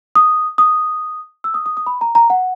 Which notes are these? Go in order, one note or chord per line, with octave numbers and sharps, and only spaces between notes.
D#6
D#6
E6
D#6
D#6
D#6
B5
A#5
A#5
F#5